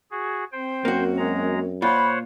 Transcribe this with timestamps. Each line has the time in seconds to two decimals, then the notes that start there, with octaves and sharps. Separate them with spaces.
0.11 F#4 G#4
0.52 C4 C5 G5
0.85 F#2 A#3 F#4
1.17 G#3 A#5
1.82 A#2 F4 C5 C#5 F#5 B5